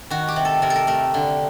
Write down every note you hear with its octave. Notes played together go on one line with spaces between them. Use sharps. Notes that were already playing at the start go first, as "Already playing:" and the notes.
D#3 F#4
G4
C3
A4
C3 A#4
A4
A#4
A3 A#4
D3